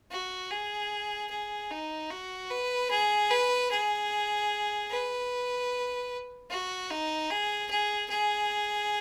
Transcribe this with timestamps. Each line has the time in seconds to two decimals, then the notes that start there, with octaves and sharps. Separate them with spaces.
0.11 F#4
0.51 G#4
1.30 G#4
1.71 D#4
2.10 F#4
2.50 B4
2.90 G#4
3.31 B4
3.71 G#4
4.91 B4
6.50 F#4
6.90 D#4
7.30 G#4
7.70 G#4
8.10 G#4